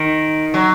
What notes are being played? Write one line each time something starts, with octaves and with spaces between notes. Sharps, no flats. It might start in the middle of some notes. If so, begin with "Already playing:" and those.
Already playing: D#3
F#3